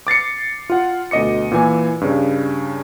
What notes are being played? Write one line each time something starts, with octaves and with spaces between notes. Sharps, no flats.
D6 A6 C7 C#7
F4 F#5
D2 B2 D#5 D6 C#7
A#2 E3 G#5
G2 C#3